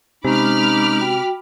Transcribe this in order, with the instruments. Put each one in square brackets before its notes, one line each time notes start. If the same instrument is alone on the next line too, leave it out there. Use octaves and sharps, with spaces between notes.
[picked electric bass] C3 [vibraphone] G#3 C#4 [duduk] D#4 [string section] B5 D6 F6
[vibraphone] F#4 G5